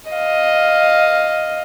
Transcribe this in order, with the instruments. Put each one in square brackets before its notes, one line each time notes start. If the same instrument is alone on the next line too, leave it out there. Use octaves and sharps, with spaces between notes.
[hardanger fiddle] D#5 F5